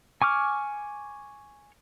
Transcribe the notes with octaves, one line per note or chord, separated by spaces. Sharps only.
G#5 C#6 D6 F6